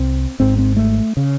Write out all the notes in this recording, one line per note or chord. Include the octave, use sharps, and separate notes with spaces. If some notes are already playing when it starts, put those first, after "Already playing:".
Already playing: C2 C4
G#1 G#2 C4
C4
A3
C#3